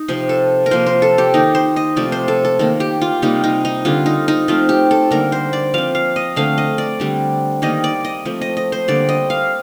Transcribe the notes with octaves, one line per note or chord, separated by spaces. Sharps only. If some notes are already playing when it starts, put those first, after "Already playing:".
Already playing: D#4
C3 F3 C4 C5
A4
A#4
C3 F3 A#3 C5
C5
A4
G4
D#3 A#3 D#4
C5
D#5
C3 F3 A3 D5
C5
A4
A4
D#3 A#3 A4
G4
F4
C3 G3 A#3 D#4
D#4
D#4
D3 G3 C4 F4
D#4
D#4
F3 A3 C4 F4
G4
A4
D3 G3 A#3 A#4
C5
D5
F3 C4 F5
F5
D#5
D3 A3 C4 F5
D#5
D5
D3 G3 C4
D#3 G3 A#3 D#5
D5
D#5
F3 A3 C4
D#5
D#5
C5
D3 G3 A#3 D5
D#5
F5